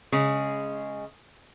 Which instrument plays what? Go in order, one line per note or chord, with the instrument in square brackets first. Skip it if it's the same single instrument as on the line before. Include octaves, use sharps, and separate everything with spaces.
[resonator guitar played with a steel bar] C#3 [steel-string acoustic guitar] G#3